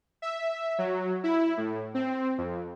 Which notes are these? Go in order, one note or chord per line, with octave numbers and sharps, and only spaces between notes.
E5
F#3
E4
A2
C4
F2